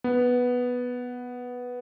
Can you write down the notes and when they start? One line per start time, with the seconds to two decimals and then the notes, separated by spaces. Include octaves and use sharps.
0.04 B3